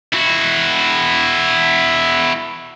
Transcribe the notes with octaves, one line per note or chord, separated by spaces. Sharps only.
E4 F#4